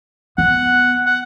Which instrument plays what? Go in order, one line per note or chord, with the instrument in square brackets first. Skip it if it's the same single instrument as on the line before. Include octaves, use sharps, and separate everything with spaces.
[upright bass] B3 [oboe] F#5
[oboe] F#5